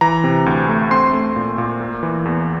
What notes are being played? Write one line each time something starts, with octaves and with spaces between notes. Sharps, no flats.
E3 A#5
C3
D2
A3
C4 C6
A3
A#2
A#2
A#3
E3
E2